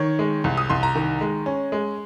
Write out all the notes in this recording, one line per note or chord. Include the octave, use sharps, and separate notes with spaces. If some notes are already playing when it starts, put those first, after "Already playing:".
Already playing: D#3 C#5
G#3
C2
D#6
C2 C6
A#5
D#3
G#3
C#4
G#3